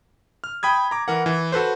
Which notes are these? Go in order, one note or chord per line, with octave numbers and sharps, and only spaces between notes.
F6
G5 B5 D#6 G#6
A#5 D6
E3 A#4 F#5
E3
F#4 A4 B4 C5